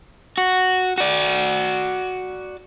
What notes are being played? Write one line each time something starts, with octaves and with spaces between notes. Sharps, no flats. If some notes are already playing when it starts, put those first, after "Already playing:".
F#4
F#4 D5